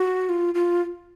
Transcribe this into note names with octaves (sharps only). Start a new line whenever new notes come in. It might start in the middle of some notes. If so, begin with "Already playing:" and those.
Already playing: F#4
F4
F4